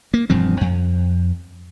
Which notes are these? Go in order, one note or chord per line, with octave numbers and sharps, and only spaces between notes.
A#3
E1 G2 F3 C4
F2